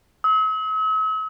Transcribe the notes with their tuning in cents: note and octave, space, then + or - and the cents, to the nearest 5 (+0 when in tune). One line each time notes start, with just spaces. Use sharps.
E6 -45